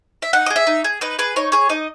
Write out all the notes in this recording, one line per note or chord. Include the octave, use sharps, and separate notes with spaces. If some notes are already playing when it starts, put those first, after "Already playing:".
E5
D#4 F#5
G#4 D#5
E5
D#4
G#4
D#4 B4
G#4 B4
D#4 C#5
G#4 C#5
D#4 D#5